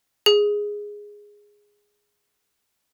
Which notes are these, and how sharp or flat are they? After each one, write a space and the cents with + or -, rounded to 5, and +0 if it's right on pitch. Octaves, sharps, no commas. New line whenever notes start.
G#4 -5